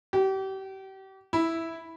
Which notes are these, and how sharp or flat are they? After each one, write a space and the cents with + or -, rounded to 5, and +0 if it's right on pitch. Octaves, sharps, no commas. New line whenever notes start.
G4 -35
E4 -5